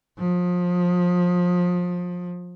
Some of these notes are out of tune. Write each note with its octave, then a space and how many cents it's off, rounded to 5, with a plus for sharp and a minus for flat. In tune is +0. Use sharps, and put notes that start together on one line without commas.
F3 +25